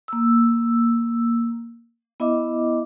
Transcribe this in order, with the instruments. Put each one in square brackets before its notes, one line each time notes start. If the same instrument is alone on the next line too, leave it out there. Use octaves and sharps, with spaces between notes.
[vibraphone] A#3 E6
B3 E4 D#5 E5 D6